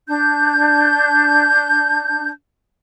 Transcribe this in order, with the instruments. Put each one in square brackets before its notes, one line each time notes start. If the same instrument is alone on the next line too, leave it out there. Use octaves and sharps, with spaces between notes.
[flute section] D4 G6